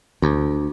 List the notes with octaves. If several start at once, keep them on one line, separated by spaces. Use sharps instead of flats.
D2